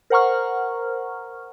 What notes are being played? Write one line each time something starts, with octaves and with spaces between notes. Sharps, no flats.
A#4 C5 F#5 A#5 C#6 F6